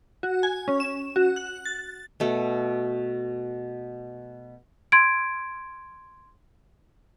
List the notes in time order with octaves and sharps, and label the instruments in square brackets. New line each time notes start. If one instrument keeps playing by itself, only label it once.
[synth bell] F#4
G#5
C#4
E7
F#4
F#6
A6
[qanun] B2 A3
[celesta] C6 G#6 D7